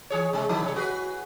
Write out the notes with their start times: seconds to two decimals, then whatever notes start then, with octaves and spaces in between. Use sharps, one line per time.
0.10 E3 G#4 C#5
0.33 C3 G#3
0.49 D#3 F3 E4
0.63 C3 G3 C#5
0.76 F#4 G#4 B4